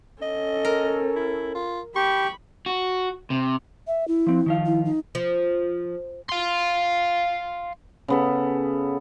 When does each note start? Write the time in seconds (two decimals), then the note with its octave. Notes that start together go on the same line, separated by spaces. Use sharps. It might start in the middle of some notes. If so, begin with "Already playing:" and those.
0.22 C#4 A4 D#5
0.65 A#4
1.16 E4
1.55 F4
1.96 G4 B5 C#6
2.66 F#4
3.30 C3
3.87 E5
4.08 E4
4.27 F3 C4
4.46 D#3 F3 F5
4.66 E4
4.85 D#4
5.15 F3
6.29 F5 C6
8.08 C#3 B3 A4